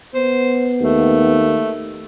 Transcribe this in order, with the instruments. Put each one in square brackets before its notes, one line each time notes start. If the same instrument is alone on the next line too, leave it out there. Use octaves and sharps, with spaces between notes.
[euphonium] B3 [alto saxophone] C5
[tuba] D#2 [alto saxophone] A3